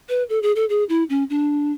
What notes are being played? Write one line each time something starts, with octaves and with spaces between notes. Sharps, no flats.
B4
A4
G#4
A4
G#4
E4
C#4
D4